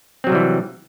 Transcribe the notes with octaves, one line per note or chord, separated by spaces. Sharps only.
C3 E3 F#3 G3 C4